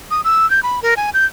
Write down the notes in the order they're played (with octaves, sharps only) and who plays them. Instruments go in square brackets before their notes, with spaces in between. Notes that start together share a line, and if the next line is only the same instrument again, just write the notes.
[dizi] D#6
E6
G6
B5
A#4
G#5
G6